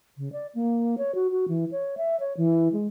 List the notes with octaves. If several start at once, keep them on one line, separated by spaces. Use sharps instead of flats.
C#3
D5
A#3
C#5
F#4
F#4
E3
C#5
E5
C#5
E3
G#3